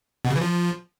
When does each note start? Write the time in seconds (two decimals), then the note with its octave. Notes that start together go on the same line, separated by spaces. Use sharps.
0.25 B2
0.30 C#3
0.36 E3
0.41 F3